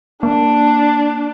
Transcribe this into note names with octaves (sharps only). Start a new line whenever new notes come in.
A#3 D4